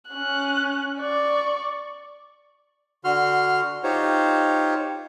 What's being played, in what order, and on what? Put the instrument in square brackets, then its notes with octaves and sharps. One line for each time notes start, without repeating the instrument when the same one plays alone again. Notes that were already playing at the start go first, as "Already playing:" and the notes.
[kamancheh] C#4 F#6
D5 C#6
[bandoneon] D3 F#4 C6 F6
D#4 F4 G4 C5 C#5